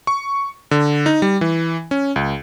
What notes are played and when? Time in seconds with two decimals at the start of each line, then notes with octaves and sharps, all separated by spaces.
0.07 C#6
0.71 D3
1.06 D#4
1.22 G3
1.41 E3
1.91 C#4
2.16 C#2